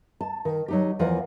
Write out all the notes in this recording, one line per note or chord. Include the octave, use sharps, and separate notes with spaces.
A5
D#3
F#3 D#4 G4
E2 E3 F3 A#4 F#5 G#5